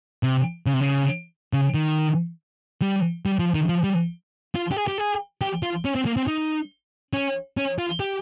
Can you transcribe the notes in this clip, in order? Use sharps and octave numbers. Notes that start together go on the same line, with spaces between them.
C3
C#3
C3
C#3
C#3
D#3
G3
G3
F3
D#3
F3
G3
F4
G4
G#4
G4
G#4
G4
F4
C#4
C4
A#3
C4
D#4
C#4
C#4
F4
G4